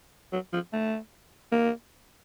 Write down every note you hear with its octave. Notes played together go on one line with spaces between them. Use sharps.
F#3
F3
A3
A#3